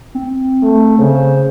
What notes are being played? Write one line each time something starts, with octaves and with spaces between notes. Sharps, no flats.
C4
A3
C#3 C5